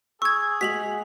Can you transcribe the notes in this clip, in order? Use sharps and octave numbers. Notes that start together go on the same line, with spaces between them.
G#4 C#6 E6 G#6
G#3 F#4 B6 F7 F#7